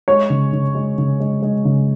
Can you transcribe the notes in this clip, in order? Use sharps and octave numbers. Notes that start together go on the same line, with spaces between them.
G#3 C#5
C#3
C#3
G#3
C#3
G#3
G#3
C#3